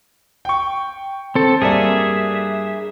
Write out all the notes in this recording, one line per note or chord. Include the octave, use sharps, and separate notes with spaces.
G5 C#6
C4 A4
G2 A#3 G#4 D5 E5